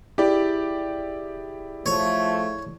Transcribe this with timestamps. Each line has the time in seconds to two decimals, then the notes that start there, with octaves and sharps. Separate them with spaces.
0.18 E4 G4 G#4 D5
1.86 F3 A3 C#5